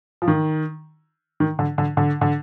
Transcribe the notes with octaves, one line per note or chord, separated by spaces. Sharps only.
F3
D#3
D#3
D3
D3
D3
D3